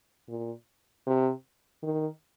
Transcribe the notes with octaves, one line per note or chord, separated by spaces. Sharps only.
A#2
C3
D#3